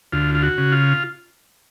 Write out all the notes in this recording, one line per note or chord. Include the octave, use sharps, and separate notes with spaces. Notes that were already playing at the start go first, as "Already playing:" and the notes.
D2 F4
F4
F#4
C#3
F4